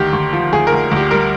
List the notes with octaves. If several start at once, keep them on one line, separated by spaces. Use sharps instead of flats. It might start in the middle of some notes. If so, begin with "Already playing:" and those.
Already playing: D2 D#3 G4
D2
F3
D2 G#4
A#4
D2
D2 G4
G3 A#4